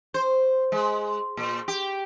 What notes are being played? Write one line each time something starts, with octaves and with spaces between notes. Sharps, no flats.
C5
G#3
A#2
G4